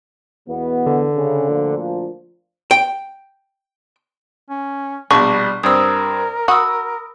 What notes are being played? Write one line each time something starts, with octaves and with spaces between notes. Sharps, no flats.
E2 B2 B3
D3
C#3
D2 A#2 F3
G5
C#4
A#1 B2 G3 D4 C#6
G2 C4 A#4 D#6 E6
F#4 B5 D#6 E6